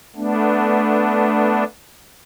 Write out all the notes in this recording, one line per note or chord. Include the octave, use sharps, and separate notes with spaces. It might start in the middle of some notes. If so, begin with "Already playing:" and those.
A3 B3 D4